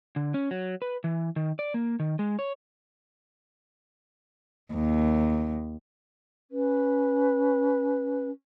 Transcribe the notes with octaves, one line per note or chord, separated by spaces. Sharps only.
D3
C#4
F#3
B4
E3
D#3
D5
A#3
D#3
G#3
C#5
D#2
C#4 B4